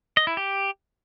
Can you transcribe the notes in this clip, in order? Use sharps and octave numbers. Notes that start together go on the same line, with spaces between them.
D#5
E4
G4